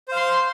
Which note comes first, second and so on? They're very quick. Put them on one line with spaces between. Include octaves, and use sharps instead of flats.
C5 F5 C6